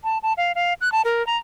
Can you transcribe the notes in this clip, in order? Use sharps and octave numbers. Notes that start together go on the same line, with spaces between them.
A5
A5
F5
F5
F#6
A5
A#4
A#5